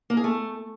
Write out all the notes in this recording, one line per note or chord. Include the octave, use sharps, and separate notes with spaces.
A#3
G#4
A3